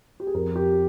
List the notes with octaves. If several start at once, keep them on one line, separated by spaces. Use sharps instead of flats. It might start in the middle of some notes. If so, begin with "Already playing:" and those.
G4
G#4
F2 A#4
G4